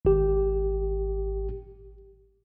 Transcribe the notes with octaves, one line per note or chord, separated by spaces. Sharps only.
G#1 G4